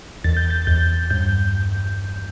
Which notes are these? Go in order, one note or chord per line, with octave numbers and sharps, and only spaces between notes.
E2 A6
G6
A6
E2 G6
G2 G6